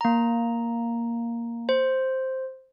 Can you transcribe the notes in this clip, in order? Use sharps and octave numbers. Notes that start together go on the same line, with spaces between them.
A#3 A#5
C5